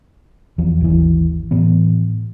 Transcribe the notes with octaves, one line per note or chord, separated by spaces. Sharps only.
E2 F3
G#1 D#2 E3
A2 E3 B3